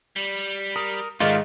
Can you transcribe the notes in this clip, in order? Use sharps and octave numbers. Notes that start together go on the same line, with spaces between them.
G3
A#4 D#6
G#2 D#3 G#3 A3 F4 D5 F5